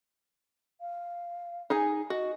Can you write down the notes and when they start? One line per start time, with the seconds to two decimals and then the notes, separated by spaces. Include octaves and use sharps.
0.81 F5
1.70 D#4 G#4 G#5
2.10 F#4 D#5